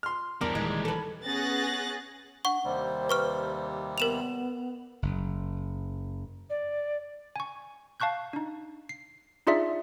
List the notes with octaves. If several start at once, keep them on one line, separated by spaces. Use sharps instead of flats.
C6 F6
E2 G2 E3 G3 B3 D4 A#4
E1 A#2 D#3 G#3
A4 B4
B3 C#4 G#4 F#6 A6 A#6
D4 F#5 C#6
D#2 C3 G3 C5
B4 C#6 F6
B3 A#4 E7 F7
F#1
D5
G#5 C#6
F5 A5 C#6 F#6 G6
D4 D#4
C7
D4 D#4 F4 G#4 D5 E5